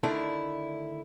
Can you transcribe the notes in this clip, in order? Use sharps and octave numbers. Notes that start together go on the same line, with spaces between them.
D3 D#3 A3 D4 E4